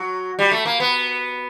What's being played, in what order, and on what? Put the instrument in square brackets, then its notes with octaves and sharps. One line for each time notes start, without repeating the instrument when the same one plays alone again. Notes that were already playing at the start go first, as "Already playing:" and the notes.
Already playing: [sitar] F#3
G3
A3
A#3
B3